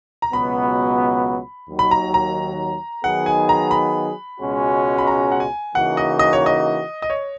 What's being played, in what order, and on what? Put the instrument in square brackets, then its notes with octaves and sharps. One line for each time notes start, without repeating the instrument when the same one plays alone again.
[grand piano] A#5
[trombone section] C#2 B2 F#3 B3 [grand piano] B5
[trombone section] D#2 D#3 F#3
[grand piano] B5
A#5
A#5
[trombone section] D#3 F#3 B3 D#4 G#4 [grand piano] F#5
[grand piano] G#5
A#5
B5
[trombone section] C#2 B2 G#3 C#4 F#4
[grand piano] B5
A#5
F#5
G#5
[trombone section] C#3 E3 A#3 D#4 F#4 [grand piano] F#5
[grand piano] D#5
D#5
C#5
D#5
D#5
C#5